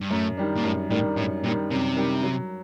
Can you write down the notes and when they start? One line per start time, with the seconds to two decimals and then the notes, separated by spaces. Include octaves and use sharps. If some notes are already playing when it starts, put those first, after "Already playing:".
0.01 G2
0.10 F#2 A2
0.37 D#3 G3 D4
0.57 A#2
0.64 F#2 A2
0.90 A2 D#3 G3 D4
1.16 F#2 A2
1.43 A#2 D#3 G3 D4
1.71 F#2 C3
1.97 D#3 G3 D4
2.23 F#3